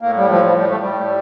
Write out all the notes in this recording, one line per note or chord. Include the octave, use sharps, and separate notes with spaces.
A2 A#3
G3
F3
F3
G3
A3
G3
A2